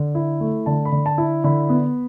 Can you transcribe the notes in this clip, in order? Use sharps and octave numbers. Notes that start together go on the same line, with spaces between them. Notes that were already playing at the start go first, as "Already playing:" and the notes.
Already playing: D3
E4
A3
D3 A5
B5
D3
A5
E4
D3 B5
B3